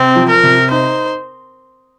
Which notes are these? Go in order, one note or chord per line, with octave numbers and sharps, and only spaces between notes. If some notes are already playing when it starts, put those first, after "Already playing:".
Already playing: C3 C4
F3
A#4
C3
D#4 C5